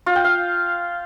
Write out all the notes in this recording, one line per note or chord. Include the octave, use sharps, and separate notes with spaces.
F4
G5
F5